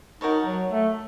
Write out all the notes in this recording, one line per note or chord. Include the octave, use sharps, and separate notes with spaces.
D#4 F#4 A#4 C#5 A5
F#3
A3